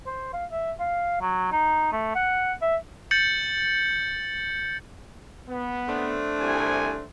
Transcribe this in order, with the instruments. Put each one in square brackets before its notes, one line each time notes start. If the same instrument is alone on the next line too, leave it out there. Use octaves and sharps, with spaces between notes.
[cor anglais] C5
F5
E5
F5
F#3
D#4
A3
F#5
E5
[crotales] G6 A6 C#7 F#7
[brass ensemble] B3
[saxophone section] A3 C4 D4
[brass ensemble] C2 G#5